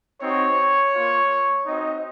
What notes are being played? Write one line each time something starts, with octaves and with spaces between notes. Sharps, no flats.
C4 D#4 F#4 C#5
A#3 F4
C4 D#4 F#4 D#5